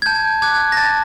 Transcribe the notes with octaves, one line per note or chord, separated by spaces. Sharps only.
G#6
A5 G6
D6 F#6 G#6
A#6
A5 A6